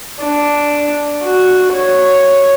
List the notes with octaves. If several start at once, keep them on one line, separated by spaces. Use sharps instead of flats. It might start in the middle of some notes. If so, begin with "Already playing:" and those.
D4
F#4
C#5